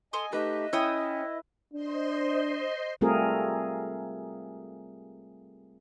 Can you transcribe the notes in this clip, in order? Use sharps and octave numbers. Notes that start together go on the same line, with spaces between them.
A4 D#5 G#5 C6 D#6
A3 D#4 G4 B4 D#5 E5
C#4 E4 C#5 G5 D#6
D4 C5 D#5 C6
G3 A3 C4 F4 G#4 A#4